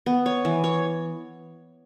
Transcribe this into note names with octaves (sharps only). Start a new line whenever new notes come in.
B3
C#5
E3
C#5